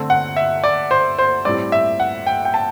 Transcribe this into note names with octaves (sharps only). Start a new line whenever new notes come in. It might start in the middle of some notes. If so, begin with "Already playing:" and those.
Already playing: D3 A3 C4
F#5
E5
D5
C5
C5
A2 G3 C4 D5
E5
F#5
G5
G5
A5